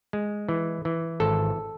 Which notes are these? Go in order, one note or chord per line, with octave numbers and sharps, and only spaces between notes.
G#3
E3
E3
G#1 A4